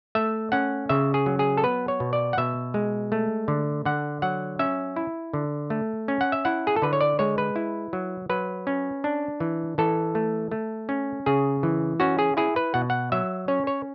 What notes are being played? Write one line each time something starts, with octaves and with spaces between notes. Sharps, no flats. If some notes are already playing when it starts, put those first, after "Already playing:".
A3 E5
C#4 F#5
C#3 E5
G#4
F#3
G#4
A4
B3 B4
C#5
B2
D5
F#5
B2 E5
G#3
A3
D3
D3 F#5
F#3 F#5
C#4 E5
E4
D3
A3
C#4
F#5
E5
E4 F#5
G#4
A4
D3 B4
C#5
D5
G#3 C#5
B4
E4
F#3
F#3 B4
C#4
D4
E3
E3 A4
A3
A3
C#4
C#3 G#4
E3
C#4 F#4
G#4
E4 G#4
B4
B2 F#5
F#5
F#3 E5
C#4 C#5
C#5